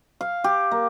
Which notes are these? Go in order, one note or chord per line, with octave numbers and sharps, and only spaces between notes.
F5
G4
A#3